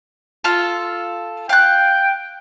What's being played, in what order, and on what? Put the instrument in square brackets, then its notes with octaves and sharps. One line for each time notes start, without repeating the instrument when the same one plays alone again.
[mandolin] F4 A4
[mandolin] F5 F#6 [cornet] G5